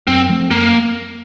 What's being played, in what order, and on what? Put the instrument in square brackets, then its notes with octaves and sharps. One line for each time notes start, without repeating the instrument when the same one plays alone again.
[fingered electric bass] F#2 [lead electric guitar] C4
[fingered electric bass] F3 A3 C4
[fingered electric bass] F#2 [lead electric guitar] A#3